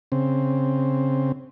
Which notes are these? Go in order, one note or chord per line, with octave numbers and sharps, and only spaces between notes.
C#3 C4